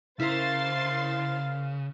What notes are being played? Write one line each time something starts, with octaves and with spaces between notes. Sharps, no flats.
C#3 E4 A#4 C5 F5 C6 A6 E7